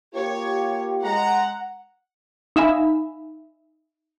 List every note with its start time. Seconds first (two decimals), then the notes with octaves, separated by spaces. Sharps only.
0.15 A#3 F4 G4 C#5
1.04 G#3 F#5 A#5
2.56 D#4 E5 F5 G#5 B5